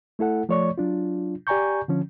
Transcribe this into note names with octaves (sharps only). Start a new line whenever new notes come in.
A3 E4 A4 F#5
F3 A3 C#5 D5 C#6
F#3 D4 F4
G4 D5 G#5 A#5 C#6 G6
D3 F3 C#4